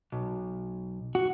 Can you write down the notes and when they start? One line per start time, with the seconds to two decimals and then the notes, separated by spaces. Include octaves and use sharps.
0.12 B1
1.15 F#4